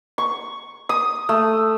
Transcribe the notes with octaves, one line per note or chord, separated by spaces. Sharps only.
C#6
D#6
A3